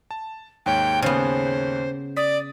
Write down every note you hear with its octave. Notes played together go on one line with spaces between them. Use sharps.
A5
D#2 G#2 C#5 G5
C#3 B3 C5
D5 D#6 B6